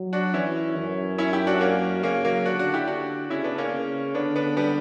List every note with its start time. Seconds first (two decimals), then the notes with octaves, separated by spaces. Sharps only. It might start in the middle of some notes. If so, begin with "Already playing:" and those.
Already playing: F#3
0.13 D4 F#4
0.34 E3 C#4 E4
0.76 F#2
1.18 C#4 E4
1.33 E4 G4
1.47 D4 F#4
1.61 A#3 C#4
2.03 C#3 A#3 C#4
2.25 F#3 A#3
2.45 D3 D4 F#4
2.59 D4 F#4
2.74 E4 G4
2.87 D3 D4 F#4
3.30 C#3 C#4 E4
3.44 B3 D4
3.58 A#3 C#4
3.72 C#3
4.15 D3 B3 D4
4.36 B3 D4
4.57 G3 B3